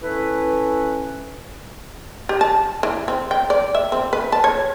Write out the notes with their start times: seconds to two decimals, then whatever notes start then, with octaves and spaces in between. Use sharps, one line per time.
0.02 C#4 E4 A4 B4
2.29 G4
2.41 A5
2.83 E3
3.08 C4
3.31 G5
3.50 D5
3.75 E5
3.92 C4
4.13 B4
4.32 A5
4.44 C#5